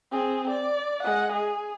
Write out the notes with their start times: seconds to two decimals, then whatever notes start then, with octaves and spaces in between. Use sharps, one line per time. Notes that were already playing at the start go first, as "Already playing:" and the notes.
0.11 C4 G#4
0.50 D5
1.03 G#3 F#5
1.33 G#4